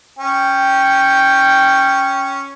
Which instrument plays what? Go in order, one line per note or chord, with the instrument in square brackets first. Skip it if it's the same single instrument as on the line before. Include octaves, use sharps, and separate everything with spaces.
[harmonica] C#4 [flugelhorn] G5